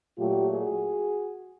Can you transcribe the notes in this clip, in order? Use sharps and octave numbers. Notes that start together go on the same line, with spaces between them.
A#2 F#3 A3 F4 G4
F#4 G#4